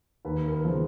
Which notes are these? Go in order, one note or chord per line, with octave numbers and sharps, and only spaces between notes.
D#2 B4
A#4
B4
C#3 F3